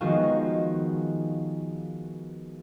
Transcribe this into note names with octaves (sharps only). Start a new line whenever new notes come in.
D#3 F3 G#3 B3 F4 F#4